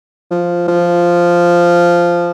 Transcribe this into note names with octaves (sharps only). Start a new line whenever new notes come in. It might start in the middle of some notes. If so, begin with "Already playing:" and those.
F3
F3